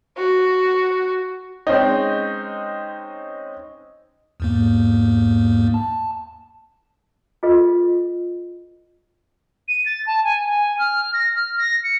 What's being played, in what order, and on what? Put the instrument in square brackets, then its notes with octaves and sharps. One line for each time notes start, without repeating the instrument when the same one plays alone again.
[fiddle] F#4
[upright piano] G#3 C4 C#4 D#4
[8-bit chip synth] E2 G#2 A#3
A5
[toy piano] F4 G#4 A4 B4 D#5
[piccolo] D#7
A6
A5
G#5
G#5
F6
A#6
F6
A#6
C#7